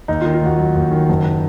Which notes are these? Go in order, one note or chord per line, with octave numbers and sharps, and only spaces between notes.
D#2 D#4
F4
D#3
F4
D#2 F#4
F#3
D#2
D#3
F#1